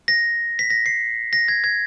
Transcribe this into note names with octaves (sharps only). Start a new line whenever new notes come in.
A#6
B6
A#6
C7
A#6
G#6
G#6